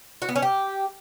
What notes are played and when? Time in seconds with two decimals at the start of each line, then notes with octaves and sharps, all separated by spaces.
0.22 F#4
0.29 B3
0.36 C#4
0.42 G4